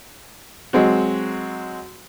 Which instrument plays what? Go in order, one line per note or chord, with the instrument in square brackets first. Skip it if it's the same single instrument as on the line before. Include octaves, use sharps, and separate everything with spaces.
[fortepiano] F#3 G#3 C4 F#4